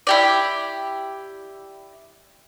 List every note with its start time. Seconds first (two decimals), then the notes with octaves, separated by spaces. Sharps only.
0.07 E4 G4 D5